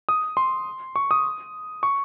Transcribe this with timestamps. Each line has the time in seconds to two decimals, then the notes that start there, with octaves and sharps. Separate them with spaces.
0.09 D#6
0.37 C6
0.96 C#6
1.11 D#6
1.83 C#6